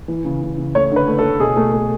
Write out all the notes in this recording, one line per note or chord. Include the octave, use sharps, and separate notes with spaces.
E3
C#3
C#3
C#3
A3 C#5
D3 B4
A3
A4
A3
B2 G#4
A3
A3